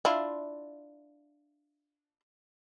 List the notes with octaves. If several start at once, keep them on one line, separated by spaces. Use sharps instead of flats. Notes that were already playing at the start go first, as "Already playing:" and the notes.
D4 E4 F4